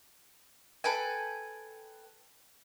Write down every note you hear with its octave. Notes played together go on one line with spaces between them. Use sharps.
A4 B4 G5 G#5